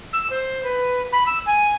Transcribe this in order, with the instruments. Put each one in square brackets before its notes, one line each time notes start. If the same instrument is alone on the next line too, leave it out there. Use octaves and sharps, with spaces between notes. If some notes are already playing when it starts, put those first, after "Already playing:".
[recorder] E6
C5
B4
B5
E6
G#5